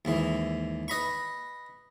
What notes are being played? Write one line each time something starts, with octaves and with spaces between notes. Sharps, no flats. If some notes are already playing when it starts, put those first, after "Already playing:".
D#2 G#2 E3
B4 D#5 B5 C#6